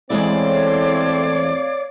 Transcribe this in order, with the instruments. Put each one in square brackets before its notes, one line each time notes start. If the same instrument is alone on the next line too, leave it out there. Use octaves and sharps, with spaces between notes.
[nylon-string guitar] E2 G#3 E4 [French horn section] A3 C4 [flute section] C#5 F5 [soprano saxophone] D5